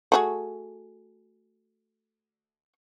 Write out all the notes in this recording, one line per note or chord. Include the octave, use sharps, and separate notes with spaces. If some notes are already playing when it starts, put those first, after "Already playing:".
A3 F#4 G#4